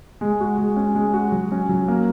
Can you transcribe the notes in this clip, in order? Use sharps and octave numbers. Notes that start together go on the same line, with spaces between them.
G#3
F#4
G#3
C#4
G#3
F#4
F#3
C#4
F#3
A#3